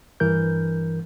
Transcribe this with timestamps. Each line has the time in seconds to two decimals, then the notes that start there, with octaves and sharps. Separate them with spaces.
0.20 G2 E3 A#4 G6